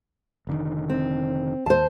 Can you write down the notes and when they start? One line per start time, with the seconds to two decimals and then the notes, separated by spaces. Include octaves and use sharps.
0.47 F1 D3 D#3
0.89 C4
1.66 D#2 C5 A5